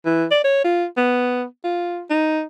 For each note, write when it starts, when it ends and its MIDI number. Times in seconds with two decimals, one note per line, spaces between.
0.05 0.26 52
0.31 0.39 74
0.44 0.62 73
0.64 0.86 65
0.97 1.45 59
1.64 2.03 65
2.10 2.43 63